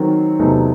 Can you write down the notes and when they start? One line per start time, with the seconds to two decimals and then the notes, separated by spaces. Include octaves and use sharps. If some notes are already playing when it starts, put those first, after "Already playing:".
Already playing: D#3 F#3 C4
0.39 E2 C3 F#3 A3 D#4